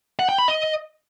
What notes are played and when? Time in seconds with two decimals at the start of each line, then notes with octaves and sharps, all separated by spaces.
0.19 F#5
0.29 G5
0.38 B5
0.48 D#5